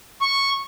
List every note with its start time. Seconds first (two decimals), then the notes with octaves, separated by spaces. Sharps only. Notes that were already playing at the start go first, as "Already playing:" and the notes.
0.21 C#6